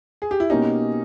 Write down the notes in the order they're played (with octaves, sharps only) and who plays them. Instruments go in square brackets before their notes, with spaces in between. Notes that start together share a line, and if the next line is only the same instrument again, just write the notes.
[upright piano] G#4
G4
E4
[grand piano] B2 A#3 C#4 G4 [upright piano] D#4